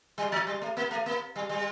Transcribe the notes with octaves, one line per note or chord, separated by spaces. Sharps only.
G3
F3
G3
A3
A#3
A3
A#3
G3
G3